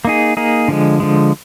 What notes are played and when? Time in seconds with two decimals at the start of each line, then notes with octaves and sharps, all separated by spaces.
0.05 A#3 D#4 G#4
0.37 A#3 D#4 G#4
0.68 D3 F3 G#3
1.00 D3 F3 G#3